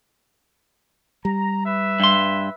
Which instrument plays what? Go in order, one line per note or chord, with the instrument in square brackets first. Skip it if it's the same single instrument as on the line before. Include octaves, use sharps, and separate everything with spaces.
[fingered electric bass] G3 [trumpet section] A#5
[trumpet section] B4 E5
[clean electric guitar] G2 C6